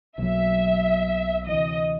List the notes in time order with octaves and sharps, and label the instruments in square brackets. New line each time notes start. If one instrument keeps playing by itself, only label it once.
[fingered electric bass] B1 B2 F#3 A#3 [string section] E5
[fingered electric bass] D2 C3 E3 [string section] D#5